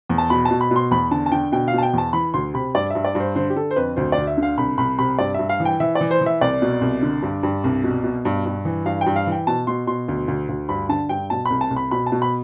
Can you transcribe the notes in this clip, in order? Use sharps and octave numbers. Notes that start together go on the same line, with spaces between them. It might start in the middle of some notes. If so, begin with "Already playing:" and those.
E2
A5
B2 B5
A5
B2
B5
B2
C6
E2 B5
D3 A5
A5
D3 G5
B2 G5
F5
B2 A5
G5
E2 A5
E3 B5
D2 C6
C3 B5
G2 D5
G2 E5
D5
G2
C5
D3 C5
G4
D3 A4
C5
F2 B4
D2 C5
D5
D2
E5
D3
F5
C2 B5
C2 B5
C3 B5
G2 D5
G2 E5
F5
E3
G5
E3 E5
D5
E3
C5
E3
E5
C2 D5
B2
C2
D3
G2
G2
C2
B2
B2
G2
G2
E3
G2 F5
G5
G2
F5
E3 G5
B2 A5
B2 C6
B2 C6
D2
D2
D2
G2 B5
D3 A5
G2 G5
B2 A5
C2 B5
A5
C2
B5
B2 B5
A5
B2
B5